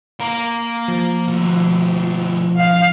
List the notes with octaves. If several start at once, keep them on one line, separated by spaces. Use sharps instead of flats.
A#3 A#4
F3
B2 A3
F5